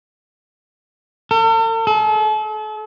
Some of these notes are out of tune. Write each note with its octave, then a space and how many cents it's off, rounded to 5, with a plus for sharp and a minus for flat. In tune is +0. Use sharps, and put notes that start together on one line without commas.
A4 +45
A4 -40